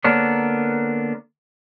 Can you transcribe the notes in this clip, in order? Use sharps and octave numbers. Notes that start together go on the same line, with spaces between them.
D3 A#3 B3 D4 A#4 C#5